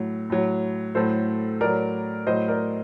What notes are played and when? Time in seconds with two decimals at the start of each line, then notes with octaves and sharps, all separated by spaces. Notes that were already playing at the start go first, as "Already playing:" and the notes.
Already playing: A2 F#3
0.30 A2 F#3
0.95 A2 F#3 A4 C5
1.61 A2 F#3 A#4 D5
2.27 A2 F#3 C5 D#5
2.48 A#4 D5